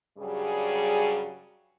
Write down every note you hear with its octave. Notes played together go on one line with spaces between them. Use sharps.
G2 C#3 F#3 G3 G#4